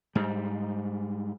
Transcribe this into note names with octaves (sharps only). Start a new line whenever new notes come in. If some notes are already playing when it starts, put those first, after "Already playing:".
G#2 G3